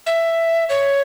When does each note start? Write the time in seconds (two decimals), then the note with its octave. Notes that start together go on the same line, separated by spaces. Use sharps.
0.06 E5
0.69 C#5